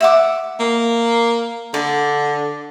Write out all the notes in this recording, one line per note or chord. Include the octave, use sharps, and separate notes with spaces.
E5 F#5 D6
A#3
D3 D5